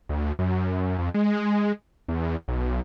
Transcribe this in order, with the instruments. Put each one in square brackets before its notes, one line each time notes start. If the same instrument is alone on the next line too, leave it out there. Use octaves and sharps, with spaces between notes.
[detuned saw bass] D2
F#2
F2
G#3
E2
B1